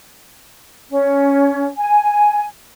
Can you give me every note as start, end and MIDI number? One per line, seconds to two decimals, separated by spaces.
0.90 1.67 61
1.78 2.45 80